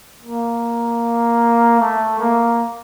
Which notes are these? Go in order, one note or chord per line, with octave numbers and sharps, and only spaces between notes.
A#3
A3
A#3